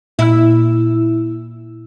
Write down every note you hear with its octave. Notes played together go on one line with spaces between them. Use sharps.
A#2 E4 E6